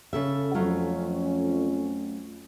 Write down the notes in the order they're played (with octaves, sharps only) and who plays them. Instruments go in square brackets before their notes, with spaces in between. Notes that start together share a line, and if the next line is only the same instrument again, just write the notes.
[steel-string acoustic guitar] C#3 A4 E5
[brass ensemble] F2 C#4 [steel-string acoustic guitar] F#3 A3 F4